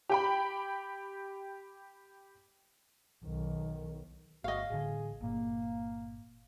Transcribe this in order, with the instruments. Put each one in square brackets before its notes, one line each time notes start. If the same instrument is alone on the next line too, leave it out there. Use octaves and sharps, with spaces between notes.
[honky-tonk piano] G4 G5 B5
[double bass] B1 D#3
[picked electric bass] G1 [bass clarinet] F#4 [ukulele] D#5 F5
[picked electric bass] A1 D3 [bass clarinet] G#4
[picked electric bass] G1 A#2 [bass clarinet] A#3